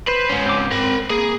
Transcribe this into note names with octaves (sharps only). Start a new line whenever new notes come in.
B4 C5
G#2 C#4
C4 D6
C4 A#4 B5
A#3 G#4